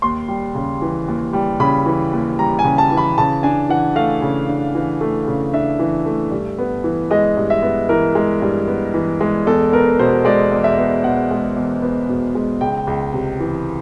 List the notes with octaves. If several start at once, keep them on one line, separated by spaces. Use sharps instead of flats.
D#2 C6
G3
C#3
E3
D#2
G3
C#3 B5
E3
D#2
G3 A#5
G#5
C#3
A5
E3
B5
C#3 A5
D4 G#5
E3 F#5
A3 F5
C#3
D4
E3
A3
C#3
D4 E5
E3
A3
G2
B3
E3
G#3 D#5
G2
E5
B3
E3 A#4
G#3
G2
B3
E3
G#3
E2 A4
B3 A#4
B2 C5
G#3 D5
E2
E5
B3
B2 F#5
G#3
E2
B3
B2
G#3
C#2 G5
C#2
C3
E3